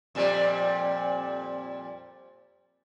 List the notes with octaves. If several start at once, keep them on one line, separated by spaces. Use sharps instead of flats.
F2 A#2 G3